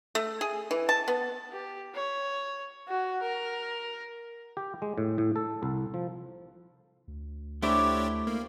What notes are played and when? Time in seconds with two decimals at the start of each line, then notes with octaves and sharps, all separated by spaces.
0.15 A3
0.41 G#4
0.71 E3
0.89 A5
1.08 B3
1.52 G4
1.94 C#5
2.88 F#4
3.22 A#4
4.57 G4
4.82 G#3
4.98 A2
5.18 A2
5.36 A4
5.63 C2
5.94 F3
7.08 D2
7.62 A3 D4 E4 G4 C5 C#5 D6
8.27 A#3